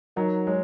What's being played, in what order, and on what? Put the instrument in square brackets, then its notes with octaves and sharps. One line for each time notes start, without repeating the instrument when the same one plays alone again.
[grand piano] F#3 [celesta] D#4 A#4 D#5 F#5 A#5
[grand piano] G#3 [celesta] C#5